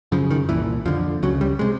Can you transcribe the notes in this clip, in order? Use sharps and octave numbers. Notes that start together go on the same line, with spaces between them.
F#2 C#3 F3
D#3
C2 A#2 E3
F2 D3 F3
C#2 C#3 F#3
G3
C3 G#3